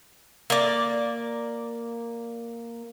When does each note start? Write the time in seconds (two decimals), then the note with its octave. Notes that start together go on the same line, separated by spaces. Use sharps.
0.50 A#3 D5